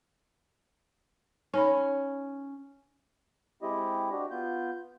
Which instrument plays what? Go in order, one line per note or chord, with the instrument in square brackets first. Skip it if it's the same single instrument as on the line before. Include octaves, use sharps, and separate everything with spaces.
[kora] C#4 [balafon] D#4 C#5 B5
[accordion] G#3 C4 E4 G4 D#5
D4 F#4 G4
B3 F4 G6